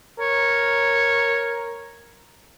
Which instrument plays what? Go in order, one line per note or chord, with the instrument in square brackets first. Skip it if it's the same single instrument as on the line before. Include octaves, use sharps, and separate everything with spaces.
[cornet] A#4 [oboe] C#5